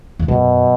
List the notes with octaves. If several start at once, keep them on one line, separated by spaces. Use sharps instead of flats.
E2
F#2 B2